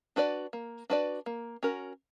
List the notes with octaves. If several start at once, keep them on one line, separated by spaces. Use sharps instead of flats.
D4 F#4 B4 D5
A#3
D4 F#4 B4 D5
A#3
C#4 F#4 A#4